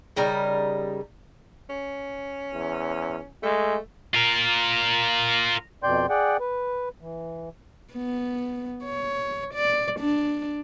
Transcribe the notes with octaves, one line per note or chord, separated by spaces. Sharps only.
C#3 G3 D#4 A#4
C#4
E2
G#3 A3
F4 A#4
F2 B2 D5 G5 C6 G6
G#4 D5 F#5 G5
B4
E3
B3
C#5
D5
D4